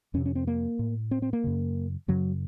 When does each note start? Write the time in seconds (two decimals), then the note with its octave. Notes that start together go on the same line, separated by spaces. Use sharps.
0.14 F2 C#4
0.17 C3
0.26 C#4
0.35 C4
0.47 A#3
0.79 A2
1.11 C4
1.22 C4
1.33 A#3
1.44 F#2 C#3
2.08 F#2 C#3 F#3